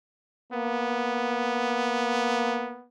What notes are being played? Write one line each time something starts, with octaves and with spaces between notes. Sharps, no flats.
A#3 B3